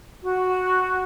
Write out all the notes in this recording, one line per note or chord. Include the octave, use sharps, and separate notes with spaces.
F#4